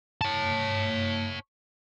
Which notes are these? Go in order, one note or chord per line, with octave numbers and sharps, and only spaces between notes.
C#5 A5